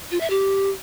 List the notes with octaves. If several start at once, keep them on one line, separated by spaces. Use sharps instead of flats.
F4
E5
G4